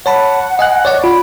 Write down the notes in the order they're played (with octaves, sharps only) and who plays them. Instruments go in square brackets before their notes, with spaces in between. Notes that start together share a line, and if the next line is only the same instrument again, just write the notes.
[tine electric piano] C#5 A5 B5 [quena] F#5
[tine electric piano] D#5 G#5 F#6
C#5 D5 F#5
[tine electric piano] F4 [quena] B5